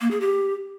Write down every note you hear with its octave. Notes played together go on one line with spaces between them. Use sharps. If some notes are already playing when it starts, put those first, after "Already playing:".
A#3
G#4
G4